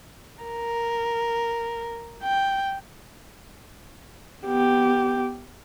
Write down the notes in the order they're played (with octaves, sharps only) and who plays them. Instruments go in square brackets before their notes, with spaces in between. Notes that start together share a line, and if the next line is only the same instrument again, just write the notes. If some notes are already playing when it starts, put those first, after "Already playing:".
[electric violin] A#4
G5
[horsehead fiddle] B3 G4